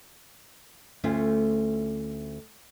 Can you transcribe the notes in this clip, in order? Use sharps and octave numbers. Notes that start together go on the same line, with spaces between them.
D2 A3 C#4 F4